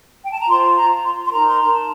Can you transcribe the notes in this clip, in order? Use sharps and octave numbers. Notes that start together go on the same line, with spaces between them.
G5
A5
A#5
F4 C5 C6
A#5
C6
C6
D#4 A#4 A#5
C6
A#5
A5